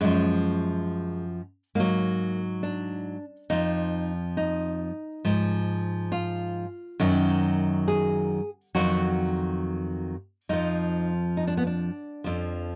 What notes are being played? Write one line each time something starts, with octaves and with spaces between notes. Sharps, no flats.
F#2 F3 G#3
G#2 F#3 A#3
D4
F2 F3 D#4
D#4
G#2 F3
F4
F#2 D#3 F#3
G#4
F2 D#3 F#3 F#4
F2 F3 D#4
D#4
D4
B3
D4
F2 F3